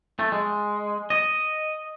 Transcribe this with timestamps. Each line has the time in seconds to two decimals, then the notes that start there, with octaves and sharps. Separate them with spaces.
0.19 A3
0.32 G#3
1.10 D#5